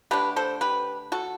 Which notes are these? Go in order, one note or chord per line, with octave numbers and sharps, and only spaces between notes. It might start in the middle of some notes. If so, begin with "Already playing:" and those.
D3 A3 D4 G4 B4
A4 C5
G4 B4
F#4 A4